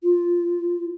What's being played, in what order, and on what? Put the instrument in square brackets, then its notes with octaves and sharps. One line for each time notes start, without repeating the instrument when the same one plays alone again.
[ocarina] F4